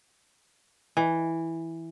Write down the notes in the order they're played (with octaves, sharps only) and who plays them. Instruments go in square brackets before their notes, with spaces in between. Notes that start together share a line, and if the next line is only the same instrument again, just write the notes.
[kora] E3